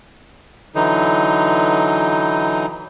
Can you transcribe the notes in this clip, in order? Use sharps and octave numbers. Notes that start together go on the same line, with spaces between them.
D3 E3 F#3 D#4